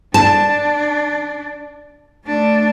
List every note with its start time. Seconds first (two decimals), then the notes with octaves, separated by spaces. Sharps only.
0.14 D4 A5
2.25 A3 D4